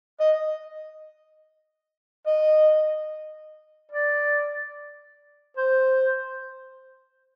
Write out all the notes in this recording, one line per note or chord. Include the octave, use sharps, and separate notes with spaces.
D#5
D#5
D5
C5